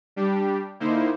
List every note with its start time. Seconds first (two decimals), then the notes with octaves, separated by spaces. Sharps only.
0.16 G3 D4 G4
0.80 D3 A#3 D#4 E4 C5